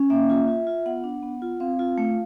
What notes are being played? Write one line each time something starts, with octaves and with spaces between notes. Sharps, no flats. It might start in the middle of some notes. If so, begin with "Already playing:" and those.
Already playing: C#4
A#3 E5
F4
F4
F4
B3 F#5
D4
B3
F4
C4 F5
F4
A3